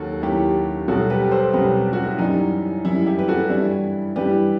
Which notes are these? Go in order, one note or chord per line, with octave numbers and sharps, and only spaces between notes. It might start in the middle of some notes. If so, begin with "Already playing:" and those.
Already playing: D#2 D#3 F#3 F#4 A4
D#2 D#3 F#3 E4 G4
C2 B2 F#3 F#4 A4
G4 B4
A4 C5
C2 B2 F#3 G4 B4
F#4
E4
F#2 E3 G3 D#4
F#2 E3 G3 E4
E4 G4
B4
F#4 A4
G2 E3 G3 E4
G2 E3 G3 G4 B4